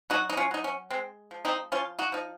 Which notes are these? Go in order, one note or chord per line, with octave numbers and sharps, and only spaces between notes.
F#3 D#4 F#4
D#4
C#4 F4
F#3 D#4
C#4
G#3 C4
F3
C4 D#4
F3 C#4 F4
D#4 F#4
F3 D#4